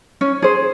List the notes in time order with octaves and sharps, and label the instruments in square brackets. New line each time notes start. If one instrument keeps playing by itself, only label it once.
[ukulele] C#4
G#4 C5